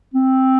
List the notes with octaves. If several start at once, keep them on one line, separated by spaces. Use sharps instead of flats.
C4